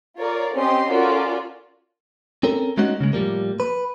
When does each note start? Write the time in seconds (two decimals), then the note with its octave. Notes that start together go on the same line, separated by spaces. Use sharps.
0.17 F4 A#4 C#5 D5
0.54 C4 C#4 G4 D#5 C6
0.88 C#4 F4 F#4 A4 A#4 D5
2.43 C4 C#4 A4 A#4
2.78 G#3 A#3 C#4 D#4 F#4 D#5
3.01 C#3 G#3
3.13 A2 F3 G3 A#3
3.60 B4